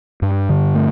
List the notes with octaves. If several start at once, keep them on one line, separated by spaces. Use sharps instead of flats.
G2
D3
A3